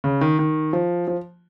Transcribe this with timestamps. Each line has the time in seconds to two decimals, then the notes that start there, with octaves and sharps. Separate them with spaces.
0.04 C#3
0.21 D#3
0.39 D#3
0.73 F3
1.07 F3